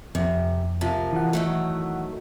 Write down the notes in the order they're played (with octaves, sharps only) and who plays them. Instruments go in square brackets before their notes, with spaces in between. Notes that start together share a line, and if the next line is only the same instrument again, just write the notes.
[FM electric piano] F2 [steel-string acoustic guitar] C3
[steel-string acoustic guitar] C3 F3 A#4
[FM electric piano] E3 F#5
[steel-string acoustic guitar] D#3 F#3 A3